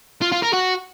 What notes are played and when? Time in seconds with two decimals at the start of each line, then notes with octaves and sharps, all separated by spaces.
0.22 F4
0.32 F4
0.43 A#4
0.54 F#4